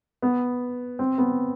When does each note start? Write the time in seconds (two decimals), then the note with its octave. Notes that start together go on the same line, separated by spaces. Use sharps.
0.22 B3
0.99 C4
1.18 B3